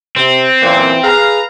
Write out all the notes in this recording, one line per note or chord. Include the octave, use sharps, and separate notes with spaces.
C3 C4
F#2 A#2 E3 C5
G#4 B4 F5 A#5